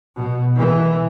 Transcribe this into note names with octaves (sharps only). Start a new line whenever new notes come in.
B2
E3